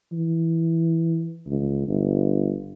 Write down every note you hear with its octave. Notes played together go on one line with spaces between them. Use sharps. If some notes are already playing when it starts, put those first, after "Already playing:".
E3
C#2
G1